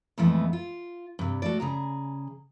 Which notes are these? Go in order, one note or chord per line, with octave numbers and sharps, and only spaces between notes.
F2 A#2 E3 G#3 A3 B3
F4
G2 C3
A3 F#4 D5
C#3 G#4 A#5